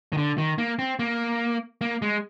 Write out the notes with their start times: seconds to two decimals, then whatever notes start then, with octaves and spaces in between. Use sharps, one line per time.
0.13 D#3
0.17 D3
0.38 D#3
0.58 A#3
0.79 C4
0.99 A#3
1.81 A#3
2.02 G#3